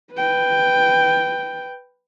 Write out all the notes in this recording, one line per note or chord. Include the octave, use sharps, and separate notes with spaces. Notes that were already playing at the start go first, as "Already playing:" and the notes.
B4 G5